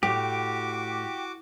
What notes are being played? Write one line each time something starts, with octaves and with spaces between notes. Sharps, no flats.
A2 F#4 G4 D6